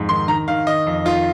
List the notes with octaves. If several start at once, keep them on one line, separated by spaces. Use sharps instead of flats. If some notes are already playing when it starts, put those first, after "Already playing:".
Already playing: F2 G#2
D#3 C6
D#3 A#5
D#3 F5
D#3 D#5
F2
D#3 F4